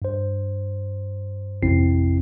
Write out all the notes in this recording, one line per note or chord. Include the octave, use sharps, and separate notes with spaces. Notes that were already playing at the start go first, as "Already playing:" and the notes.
G2 C5
A1 F2 C3 C4 E4 C7